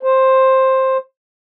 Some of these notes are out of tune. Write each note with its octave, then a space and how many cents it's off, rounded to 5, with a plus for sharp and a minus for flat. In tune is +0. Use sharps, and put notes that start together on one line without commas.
C5 +10